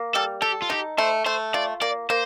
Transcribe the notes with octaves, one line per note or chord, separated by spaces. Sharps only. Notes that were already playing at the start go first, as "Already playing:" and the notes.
Already playing: A#3
G3 A4
G4 A4
F4
D#4 G4
A3 C5
A3 C5
F4 D5
A#3 D5
A#3 C5